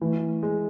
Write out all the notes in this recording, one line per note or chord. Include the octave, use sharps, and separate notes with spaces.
E3 A3
G#3